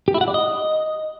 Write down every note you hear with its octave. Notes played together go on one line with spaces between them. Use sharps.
G4
E4
F#5
D5
D#5